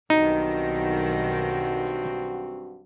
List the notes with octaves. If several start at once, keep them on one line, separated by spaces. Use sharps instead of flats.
B1 G2 D#3 C4 D#4 F#4